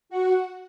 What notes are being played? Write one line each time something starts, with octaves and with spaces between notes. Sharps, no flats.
F#4 F#5